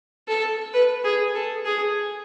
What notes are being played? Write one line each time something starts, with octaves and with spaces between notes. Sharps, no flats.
A4
B4
G#4
A4
G#4